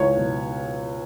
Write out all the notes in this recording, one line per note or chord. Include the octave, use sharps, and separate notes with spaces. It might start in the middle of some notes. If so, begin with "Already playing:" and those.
Already playing: C#2 E4 C#5
B2